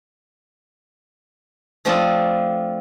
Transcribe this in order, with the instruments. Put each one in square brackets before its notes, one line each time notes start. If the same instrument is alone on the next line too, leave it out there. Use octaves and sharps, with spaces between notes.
[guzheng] F3 A3 C4 D4 F4 D#5